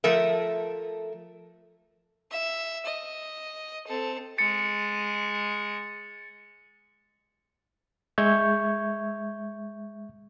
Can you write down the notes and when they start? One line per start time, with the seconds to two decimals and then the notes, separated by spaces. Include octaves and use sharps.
0.04 F3 A3 A4 A#4 E5
2.31 E5
2.86 D#5
3.87 C4 A4
4.38 G#3 A6 C#7
8.18 G#3 E5 C#6 G6 G#6